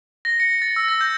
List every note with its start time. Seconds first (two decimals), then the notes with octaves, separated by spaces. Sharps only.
0.25 A#6
0.40 C#7
0.62 A6
0.76 E6
0.88 A#6
1.01 G6